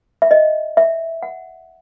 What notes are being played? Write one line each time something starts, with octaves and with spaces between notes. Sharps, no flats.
E5
D#5
E5
F#5